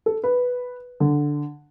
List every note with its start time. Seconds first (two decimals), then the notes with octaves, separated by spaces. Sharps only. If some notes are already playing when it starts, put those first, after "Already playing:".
0.06 A4
0.24 B4
1.00 D3